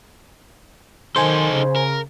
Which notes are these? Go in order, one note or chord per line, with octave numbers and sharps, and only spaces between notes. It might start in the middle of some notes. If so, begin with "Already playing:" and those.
D#3 D#4 A4 C5 G#5
C#3
A#4